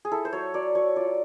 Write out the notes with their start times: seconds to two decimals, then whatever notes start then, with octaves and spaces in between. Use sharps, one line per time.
0.05 G#4
0.11 E4 A4
0.25 C5
0.33 F#3 C#5
0.54 F#3 D5
0.75 F#3 C#5
0.96 F4 D5